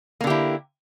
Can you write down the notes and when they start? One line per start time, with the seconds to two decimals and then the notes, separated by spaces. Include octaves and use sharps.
0.21 A#3
0.24 D3
0.27 G4
0.30 E4